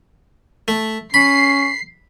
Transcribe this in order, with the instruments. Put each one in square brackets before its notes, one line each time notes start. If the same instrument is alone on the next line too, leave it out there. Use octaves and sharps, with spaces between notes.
[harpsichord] A3
[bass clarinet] C#4 [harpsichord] B5 [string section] C7